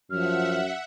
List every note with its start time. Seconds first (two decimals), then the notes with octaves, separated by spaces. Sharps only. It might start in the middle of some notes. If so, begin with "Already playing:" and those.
0.10 F#2 F3 E5 F#5 F6